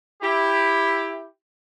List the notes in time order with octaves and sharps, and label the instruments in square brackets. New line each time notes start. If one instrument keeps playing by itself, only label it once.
[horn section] E4 G4